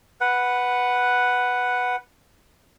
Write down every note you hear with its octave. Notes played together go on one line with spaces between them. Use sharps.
B4 F#5